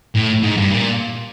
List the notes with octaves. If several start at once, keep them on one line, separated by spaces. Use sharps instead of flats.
A2
G#2
G2
A#2